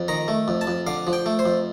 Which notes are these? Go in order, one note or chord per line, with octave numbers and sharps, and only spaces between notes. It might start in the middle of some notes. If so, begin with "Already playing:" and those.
Already playing: F2
D#3 A#5
A3
F2
A5
F2
D3 F5
F3
G5
A3
C5
F2